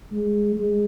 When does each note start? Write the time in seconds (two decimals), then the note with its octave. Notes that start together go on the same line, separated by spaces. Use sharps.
0.12 G#3
0.56 G#3